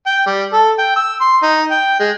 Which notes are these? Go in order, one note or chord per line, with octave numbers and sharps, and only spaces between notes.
G5
G3
A4
G5
E6
C6
D#4
G5
G#3